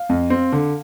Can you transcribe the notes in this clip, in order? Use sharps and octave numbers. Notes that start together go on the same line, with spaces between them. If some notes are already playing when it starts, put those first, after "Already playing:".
Already playing: F5
F2
C4
D3